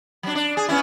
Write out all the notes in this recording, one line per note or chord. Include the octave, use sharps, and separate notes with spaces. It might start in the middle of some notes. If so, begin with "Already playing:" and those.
F#3 D4
D4
G#4
B3 C#4 E4